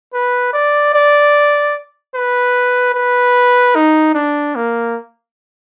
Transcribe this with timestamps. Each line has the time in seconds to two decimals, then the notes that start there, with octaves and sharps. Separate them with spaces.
0.13 B4
0.53 D5
0.94 D5
2.15 B4
2.94 B4
3.75 D#4
4.15 D4
4.56 A#3